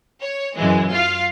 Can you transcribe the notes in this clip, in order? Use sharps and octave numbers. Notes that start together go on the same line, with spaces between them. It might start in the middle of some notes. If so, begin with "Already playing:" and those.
C#5
F#2 E3 G#3
F4 F5